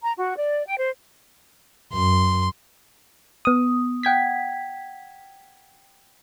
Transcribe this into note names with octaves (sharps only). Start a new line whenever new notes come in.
A#5
F#4
D5
G5
C5
F#2 C6
B3 D#6
F#5 G5 G#6 B6